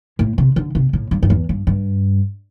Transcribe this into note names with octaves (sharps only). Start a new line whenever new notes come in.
A2
C3
D3
C3
A2
G2
G2
E2
G2
G2